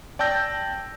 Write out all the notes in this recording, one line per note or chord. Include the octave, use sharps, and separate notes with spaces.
D5 G5 A5 E6 G6 A#6